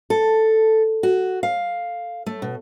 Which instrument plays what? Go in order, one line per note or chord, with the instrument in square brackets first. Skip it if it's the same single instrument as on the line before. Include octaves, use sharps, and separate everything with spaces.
[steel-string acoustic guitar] A4
F#4
F5
A3
B2